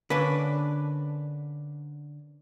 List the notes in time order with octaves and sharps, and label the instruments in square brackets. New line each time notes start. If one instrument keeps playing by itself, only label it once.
[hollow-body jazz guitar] D3 [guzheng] A#3 C#4 D4 [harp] B4